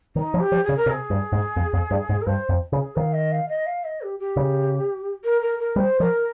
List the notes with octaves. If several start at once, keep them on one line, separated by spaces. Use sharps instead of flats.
D#3 D#4
F3
G4
F3
G#4
C#3
A#4
C3
G#4
G2
G#2
F2
F2
G2
G#2
A#4
G2 C5
F2
C#3 G#4
D#3 F5
D#5
F5
D#5
F5
D#5
G4
G4
C#3
A#4
A#4
A#4
G3 C5
F3 A#4